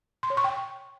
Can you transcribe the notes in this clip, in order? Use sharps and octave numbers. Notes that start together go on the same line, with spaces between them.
C6
C#5
C#6
G5